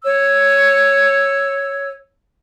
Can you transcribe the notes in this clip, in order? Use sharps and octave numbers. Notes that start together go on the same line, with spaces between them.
C#5 E6